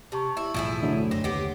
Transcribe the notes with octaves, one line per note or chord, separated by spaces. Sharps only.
C3 G4 A5 C#6
E4
B1 E2 A2 F3 E4 G#4
D3 F#3 A3 D#5
F#1 C4 C#5 A#6
D#2 D3 B3 G4 D#5 C6 D6 A#6